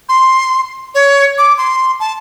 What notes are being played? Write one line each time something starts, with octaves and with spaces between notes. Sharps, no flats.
C6
C#5
D6
C6
A5